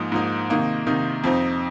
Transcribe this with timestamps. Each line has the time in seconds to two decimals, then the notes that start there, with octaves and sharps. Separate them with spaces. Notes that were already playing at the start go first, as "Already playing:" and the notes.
Already playing: G#2 F3 A#3 D#4
0.12 G#2 F3 A#3 D#4
0.50 C3 D#3 A#3 D#4
0.87 C3 D#3 A#3 D#4
1.24 F2 F3 C4 D#4